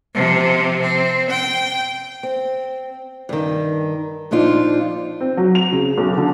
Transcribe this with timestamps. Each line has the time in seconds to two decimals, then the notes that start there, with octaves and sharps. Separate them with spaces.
0.14 C3 F3
0.81 C4
1.30 G5
2.23 C4
3.29 G2 D#3
4.31 A#2 F3 D4 D#4 F4
5.20 C4
5.37 F#3
5.55 F7
5.72 C#3
5.98 B1
6.18 D3